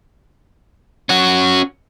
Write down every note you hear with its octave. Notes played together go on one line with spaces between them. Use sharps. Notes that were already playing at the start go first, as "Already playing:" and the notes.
C#4 F#4